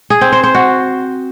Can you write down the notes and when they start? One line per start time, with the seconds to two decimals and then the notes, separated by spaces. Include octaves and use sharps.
0.10 G#4
0.21 C4
0.32 C5
0.43 C5
0.55 F#4